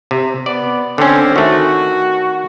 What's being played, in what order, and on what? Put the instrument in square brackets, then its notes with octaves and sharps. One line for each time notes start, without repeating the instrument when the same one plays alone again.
[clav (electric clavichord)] C3
[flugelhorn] B3 [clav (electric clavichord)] D5
[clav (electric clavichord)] D3 C#4 [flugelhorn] C4
[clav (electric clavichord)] D#3 A3 [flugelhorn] F#4